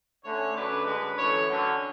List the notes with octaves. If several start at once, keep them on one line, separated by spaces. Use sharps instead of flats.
D3 A3 C#4 C#5
F#2 D3 A3 D4 B4
F#2 D3 G#3 B4
F#2 E3 A3 C#5
D3 F#3 C#4